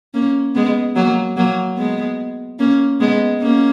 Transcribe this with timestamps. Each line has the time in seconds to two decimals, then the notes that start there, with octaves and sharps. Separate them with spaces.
0.14 A#3 C#4
0.55 G#3 B3
0.96 F#3 A#3
1.37 F#3 A#3
1.77 G#3 B3
2.59 A#3 C#4
3.00 G#3 B3
3.42 A#3 C#4